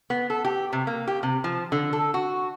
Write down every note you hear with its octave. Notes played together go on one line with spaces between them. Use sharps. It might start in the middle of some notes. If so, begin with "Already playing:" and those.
B3
A4
G4
C3
A#3
G4
C3
F3
D3
A4
F#4